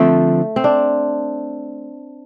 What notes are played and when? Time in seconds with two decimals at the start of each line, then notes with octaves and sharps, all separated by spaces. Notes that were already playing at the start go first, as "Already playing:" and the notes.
Already playing: D3 F3 A3 C4
0.56 C4
0.64 D4